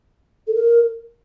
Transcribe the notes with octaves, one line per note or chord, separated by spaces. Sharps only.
A4
A#4